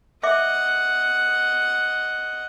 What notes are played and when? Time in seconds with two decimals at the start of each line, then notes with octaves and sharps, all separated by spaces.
0.23 D#5 E5 F#5 D6